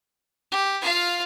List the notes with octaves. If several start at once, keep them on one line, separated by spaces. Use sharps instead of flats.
G4
F4 F5